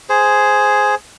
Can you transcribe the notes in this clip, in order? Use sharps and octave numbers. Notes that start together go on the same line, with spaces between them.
G#4 C5